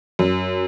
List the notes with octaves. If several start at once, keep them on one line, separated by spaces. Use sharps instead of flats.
F#2